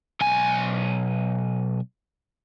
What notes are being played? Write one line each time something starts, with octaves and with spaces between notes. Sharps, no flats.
B1 G#5